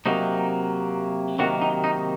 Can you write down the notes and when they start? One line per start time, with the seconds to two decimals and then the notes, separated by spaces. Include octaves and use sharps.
0.06 C3 F#3 A#3 D#4
1.39 C3 D#3 F#3 A#3 F#4
1.62 D#4
1.84 D#4